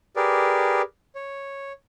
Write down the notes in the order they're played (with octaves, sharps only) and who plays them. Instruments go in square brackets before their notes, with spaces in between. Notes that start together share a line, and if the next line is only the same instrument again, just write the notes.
[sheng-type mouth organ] G4 G#4 A#4 B4 D5
C#5